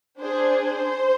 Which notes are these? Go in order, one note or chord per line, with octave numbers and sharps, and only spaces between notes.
D4 G#4 C5
C5